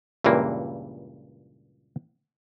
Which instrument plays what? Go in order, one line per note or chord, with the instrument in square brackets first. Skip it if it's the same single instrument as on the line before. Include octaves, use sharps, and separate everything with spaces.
[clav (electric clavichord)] C#2 G2 A#2 E3 A#3